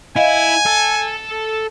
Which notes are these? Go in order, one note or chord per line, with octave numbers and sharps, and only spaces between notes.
E4 D#5 F5 G#5
A4 A5